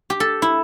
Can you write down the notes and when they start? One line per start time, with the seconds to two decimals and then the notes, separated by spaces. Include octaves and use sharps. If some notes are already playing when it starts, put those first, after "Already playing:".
0.10 G4
0.20 A4
0.42 E4